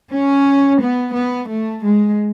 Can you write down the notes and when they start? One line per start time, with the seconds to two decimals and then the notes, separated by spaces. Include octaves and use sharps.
0.13 C#4
0.82 B3
1.15 B3
1.49 A3
1.83 G#3